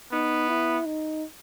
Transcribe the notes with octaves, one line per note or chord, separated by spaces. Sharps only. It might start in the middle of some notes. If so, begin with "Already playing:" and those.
B3 D#4
E4
D#4